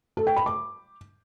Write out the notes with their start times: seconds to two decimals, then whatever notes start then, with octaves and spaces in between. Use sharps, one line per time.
0.17 A4
0.27 G5
0.36 B5
0.46 D6